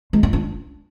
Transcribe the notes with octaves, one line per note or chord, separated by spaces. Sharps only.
G#3
F4
D4